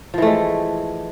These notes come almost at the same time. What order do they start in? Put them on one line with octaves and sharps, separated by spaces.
F3 E3 A3 G#3